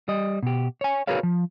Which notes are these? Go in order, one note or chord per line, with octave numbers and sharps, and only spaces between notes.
G3 D#5
B2 G4
C#5 G#5
F#4 G#4 A#4 B4 C#5 F5
F3